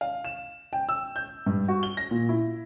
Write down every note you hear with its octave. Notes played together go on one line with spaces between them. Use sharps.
F5
E7
G5
E6
G6
G2
F#4
G7
A#6
A#2
E4